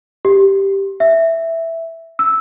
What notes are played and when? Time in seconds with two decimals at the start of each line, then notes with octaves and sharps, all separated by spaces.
0.25 G4
1.00 E5
2.19 E6